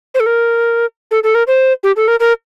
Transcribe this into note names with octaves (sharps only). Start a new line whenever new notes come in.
C5
A4
A#4
A4
A4
A#4
C5
G4
A4
A#4
A#4